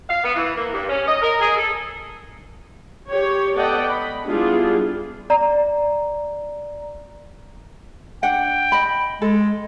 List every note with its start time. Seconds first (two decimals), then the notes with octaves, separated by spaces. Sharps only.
0.09 F5
0.23 B3
0.35 E3
0.56 A#3
0.73 G2
0.90 C#4
1.07 D#5
1.22 A#4
1.41 G#4
1.57 A4
3.09 G4 C#5
3.56 B3 A4 D5 D#5 F#5 G5
3.89 B5
4.26 G3 B3 D4 E4 F4 G#4
5.30 D5 A#5
8.23 D4 F#5 G5
8.72 D#5 B5
9.22 G#3 A4